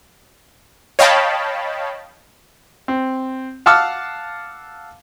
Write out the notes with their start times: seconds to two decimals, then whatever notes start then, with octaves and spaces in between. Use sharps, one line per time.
0.99 C#5 D#5 F5 G5 A5 B5
2.88 C4
3.66 F5 F#5 A5 D6 E6 F6